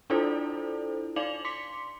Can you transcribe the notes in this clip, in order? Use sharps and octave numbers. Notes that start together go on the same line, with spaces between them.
D4 E4 F4 A4 C5 D5
D#4 D5 F5 D6 F7 F#7
C6 D6 B6 C#7